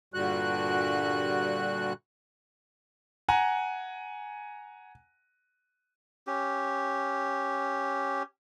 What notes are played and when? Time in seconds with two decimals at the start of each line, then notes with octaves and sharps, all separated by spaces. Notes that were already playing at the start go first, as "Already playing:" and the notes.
0.14 G2 A#2 D3 G3 F#4 F#6
3.28 F#5 G#5 A#5
6.27 C#4 G4